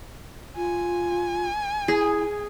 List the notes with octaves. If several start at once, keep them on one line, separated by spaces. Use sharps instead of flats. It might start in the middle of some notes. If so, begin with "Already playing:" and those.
F4 G#5
E4 G#4